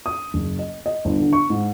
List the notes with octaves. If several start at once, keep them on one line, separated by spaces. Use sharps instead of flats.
D#6
F#1
D#5
D#5
G1
D3
C#6
G#2